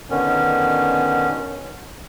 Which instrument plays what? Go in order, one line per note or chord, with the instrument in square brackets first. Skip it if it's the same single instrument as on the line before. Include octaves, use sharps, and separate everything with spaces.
[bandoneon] B2 D3 D#3 C#4